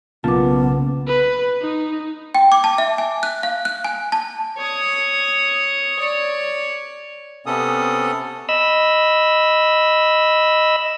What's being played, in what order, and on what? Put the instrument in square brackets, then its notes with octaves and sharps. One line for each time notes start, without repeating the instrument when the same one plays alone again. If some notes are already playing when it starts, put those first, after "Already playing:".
[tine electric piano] B1 A#3 A5 [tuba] C#3 [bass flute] B3 [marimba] F4 D6
[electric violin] B4
D#4
[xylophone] G5
D6
A5
E5
G#5
F#6
F5
F#6
G#5
A5
[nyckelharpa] C#5 D#6
C#5 D5
[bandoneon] C3 B3 C#4 A4 D#6
[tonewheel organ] D#5 B5 E6